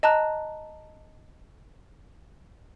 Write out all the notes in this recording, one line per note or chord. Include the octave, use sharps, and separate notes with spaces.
D#5 A5 A#5 F#6